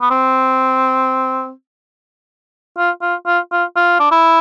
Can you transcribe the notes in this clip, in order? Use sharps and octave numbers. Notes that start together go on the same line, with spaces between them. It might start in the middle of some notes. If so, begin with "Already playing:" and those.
B3
C4
F4
F4
F4
F4
F4
D4
E4